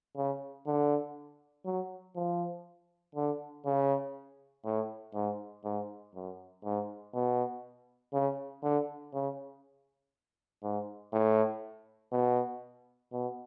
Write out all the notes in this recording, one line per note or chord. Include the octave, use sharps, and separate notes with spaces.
C#3
D3
F#3
F3
D3
C#3
A2
G#2
G#2
F#2
G#2
B2
C#3
D3
C#3
G#2
A2
B2
B2